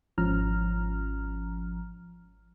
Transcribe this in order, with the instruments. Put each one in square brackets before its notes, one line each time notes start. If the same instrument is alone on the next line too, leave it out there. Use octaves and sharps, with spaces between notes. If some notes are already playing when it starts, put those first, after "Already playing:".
[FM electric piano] G#1 G#2 F3 C#4 A#5 F6